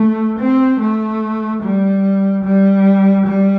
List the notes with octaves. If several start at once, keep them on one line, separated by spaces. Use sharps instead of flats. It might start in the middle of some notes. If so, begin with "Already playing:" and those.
Already playing: A3
C4
A3
G3
G3
G3